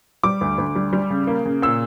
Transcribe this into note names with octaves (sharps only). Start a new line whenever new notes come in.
G3 D6
D2
D2
G3
G3
C#3
A#3
C#3
A#2 E6